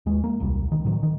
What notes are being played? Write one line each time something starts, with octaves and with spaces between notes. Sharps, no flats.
D#2 G#3
A#3
D#1 C2 C#3 G3
D#3
A2 D#3 F#3
D#3